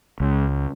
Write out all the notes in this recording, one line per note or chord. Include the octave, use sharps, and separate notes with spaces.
C#2